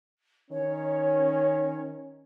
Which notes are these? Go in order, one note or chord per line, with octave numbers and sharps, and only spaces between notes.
D#3 C#4 C#5